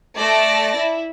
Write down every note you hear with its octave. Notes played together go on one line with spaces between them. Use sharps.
A3 D5 A5 A#6
E4